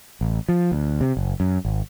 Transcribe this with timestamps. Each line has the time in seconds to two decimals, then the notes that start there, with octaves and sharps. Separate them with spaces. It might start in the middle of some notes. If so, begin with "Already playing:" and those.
0.21 A1
0.49 F3
0.72 D2
1.01 C3
1.17 F#1
1.40 F#2
1.65 G#1